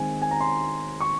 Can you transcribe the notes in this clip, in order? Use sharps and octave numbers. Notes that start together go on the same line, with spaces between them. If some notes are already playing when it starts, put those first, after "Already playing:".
Already playing: D#3 G#3 C4 G#5
G#5
A#5
C6
C#6